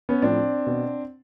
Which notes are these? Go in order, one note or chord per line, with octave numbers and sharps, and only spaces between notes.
B3 C#4
A2 F3 C4 D4
B2